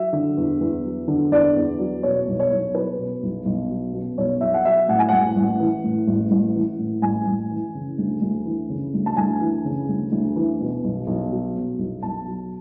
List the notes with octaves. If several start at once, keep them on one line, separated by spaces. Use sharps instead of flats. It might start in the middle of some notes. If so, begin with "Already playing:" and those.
Already playing: F#3 E5
D3
E2
E2
F#3
D3
E2 D5
E2
F#3
B2 C#5
B1
C#5
B1
F#3 B4
B2
B1
B1
F#3
B2
B1 C#5
B1 E5
F#5
F#3 E5
A2 F#5
G#5
A1 F#5
A1
E3
A2
A1
A1
E3
A2
A1 G#5
A1
E3
C#3
D2
D2
E3
C#3
D2
A5
D2 G#5
E3
C#3
D2
D2
E3
B2
B1
B1
F#3
B2
B1
B1 A5
F#3